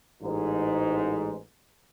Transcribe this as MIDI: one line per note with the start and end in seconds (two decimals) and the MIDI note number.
0.22 1.36 33
0.22 1.36 44